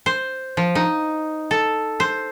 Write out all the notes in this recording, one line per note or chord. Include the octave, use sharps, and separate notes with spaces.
C5
F3
D#4
A4
C5